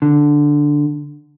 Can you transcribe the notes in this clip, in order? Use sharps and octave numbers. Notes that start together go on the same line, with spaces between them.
D3